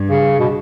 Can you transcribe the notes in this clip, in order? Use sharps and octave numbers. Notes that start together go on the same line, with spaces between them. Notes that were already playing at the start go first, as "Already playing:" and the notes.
Already playing: G2
C#3
B2